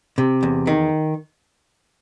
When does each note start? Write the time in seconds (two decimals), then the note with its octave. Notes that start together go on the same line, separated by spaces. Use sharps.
0.18 C3
0.43 E2
0.67 D#3